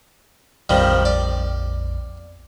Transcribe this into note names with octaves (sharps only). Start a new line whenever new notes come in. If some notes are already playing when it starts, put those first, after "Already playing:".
A#1 F2 D#3 F3 G3
D5